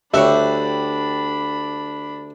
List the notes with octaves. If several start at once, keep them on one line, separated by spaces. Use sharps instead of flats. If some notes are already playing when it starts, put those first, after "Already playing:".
D2 D4 G4 C#5 D5 E5 F#5 B5